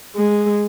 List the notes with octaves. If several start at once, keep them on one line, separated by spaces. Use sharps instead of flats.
G#3